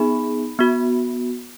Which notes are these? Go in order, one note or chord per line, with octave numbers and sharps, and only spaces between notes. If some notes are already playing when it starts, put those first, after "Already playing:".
Already playing: B3 D#4 G#4 B5
B3 F#4